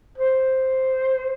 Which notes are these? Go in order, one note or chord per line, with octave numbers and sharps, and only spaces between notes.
C5